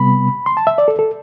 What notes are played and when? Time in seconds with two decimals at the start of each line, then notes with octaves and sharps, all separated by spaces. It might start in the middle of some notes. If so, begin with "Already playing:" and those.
Already playing: C3 G3 B3 B5
0.46 C6
0.57 A5
0.67 E5
0.78 D5
0.88 A4
0.99 A4